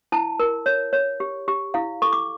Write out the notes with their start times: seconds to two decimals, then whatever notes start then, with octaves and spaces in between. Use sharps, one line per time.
0.12 E4 A5
0.40 A#4
0.66 C#5
0.93 C#5
1.20 G4
1.48 G4
1.74 E4 F5
2.02 A4 C#6
2.13 D6